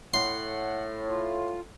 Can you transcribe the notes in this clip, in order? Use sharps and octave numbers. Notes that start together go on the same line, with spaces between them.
A2 F#5 C6
F4